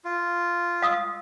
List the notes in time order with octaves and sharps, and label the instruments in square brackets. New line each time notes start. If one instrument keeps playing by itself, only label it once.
[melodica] F4
[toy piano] F5 D#6 E6